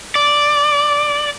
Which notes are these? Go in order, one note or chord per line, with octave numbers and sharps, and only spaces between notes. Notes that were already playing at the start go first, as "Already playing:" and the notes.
D5